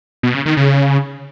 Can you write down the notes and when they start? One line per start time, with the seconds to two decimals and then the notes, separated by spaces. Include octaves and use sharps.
0.23 B2
0.35 C#3
0.46 D#3
0.57 C#3